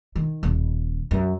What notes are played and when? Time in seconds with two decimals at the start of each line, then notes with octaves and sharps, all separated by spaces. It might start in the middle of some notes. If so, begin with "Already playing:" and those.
0.16 D#3
0.43 D#1
1.11 F#2